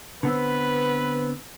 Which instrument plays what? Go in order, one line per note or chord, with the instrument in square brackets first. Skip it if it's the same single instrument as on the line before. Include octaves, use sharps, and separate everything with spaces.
[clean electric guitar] D3 B3 C4 [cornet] B4